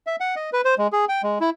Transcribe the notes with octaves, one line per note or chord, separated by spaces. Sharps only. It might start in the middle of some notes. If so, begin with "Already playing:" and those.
E5
F#5
D#5
B4
C5
G#3
G#4
G5
G#3
E4